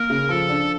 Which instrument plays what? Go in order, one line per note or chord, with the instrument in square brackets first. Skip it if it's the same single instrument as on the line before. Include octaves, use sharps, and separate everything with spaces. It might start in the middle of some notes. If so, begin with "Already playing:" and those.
Already playing: [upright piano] A#3 [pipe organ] A#4
[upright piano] C#3
[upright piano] F3 [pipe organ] A4
[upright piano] D4